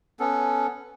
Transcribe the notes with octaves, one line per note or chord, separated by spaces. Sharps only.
B3 C#4 A4